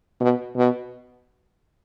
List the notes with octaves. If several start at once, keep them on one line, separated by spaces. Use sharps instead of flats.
B2
B2